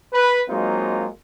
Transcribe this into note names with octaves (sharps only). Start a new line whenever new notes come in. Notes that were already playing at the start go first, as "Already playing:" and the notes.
B4
F#3 G#3 A#3 C4 D#4 F4